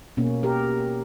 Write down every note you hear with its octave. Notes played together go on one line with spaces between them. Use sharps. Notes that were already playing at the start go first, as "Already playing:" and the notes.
B2 A#3 C#4
G4 A#4